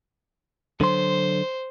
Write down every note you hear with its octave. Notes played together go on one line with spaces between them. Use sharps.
D3 F#3 C5 C6